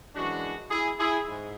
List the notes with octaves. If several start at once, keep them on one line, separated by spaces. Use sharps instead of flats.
F#2 E3 G#3 D4 F#4
E4 G#4
E4 G#4
G#2